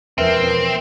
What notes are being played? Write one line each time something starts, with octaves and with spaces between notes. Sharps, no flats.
E1 F2 C4 A#4 B4 E5